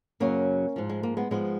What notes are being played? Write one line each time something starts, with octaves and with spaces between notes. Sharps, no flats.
F#2 C#3 F#3 A#3 C#4
G#2 F3
G#3
A#3
G#3 B3
G#2 F3 G#3 B3